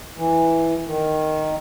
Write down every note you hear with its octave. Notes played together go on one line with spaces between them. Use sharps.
E3
D#3